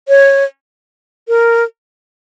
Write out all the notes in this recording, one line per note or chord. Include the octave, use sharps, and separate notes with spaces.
C#5
A#4